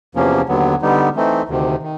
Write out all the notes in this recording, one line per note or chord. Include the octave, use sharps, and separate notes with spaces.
E2 C3 F3 A#3 C#4
D#2 D3 F#3 B3
D3 G3 B3 D#4
E3 A3 C4 D#4
D2 C3 D#3
D#3